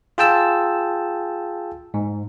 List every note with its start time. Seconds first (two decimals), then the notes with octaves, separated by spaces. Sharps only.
0.18 F4 G#4 G5 A5 E6
1.94 G#2